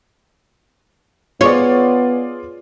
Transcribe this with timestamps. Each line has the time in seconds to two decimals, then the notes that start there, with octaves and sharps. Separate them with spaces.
1.41 B3 F4 G#4 C#5 D5